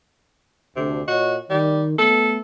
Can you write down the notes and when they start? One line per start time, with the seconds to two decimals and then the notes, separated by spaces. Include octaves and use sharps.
0.76 D2 C3
1.08 A#2 F#4 C#5 D#5
1.50 D#3 G3
1.98 A3 B3 A4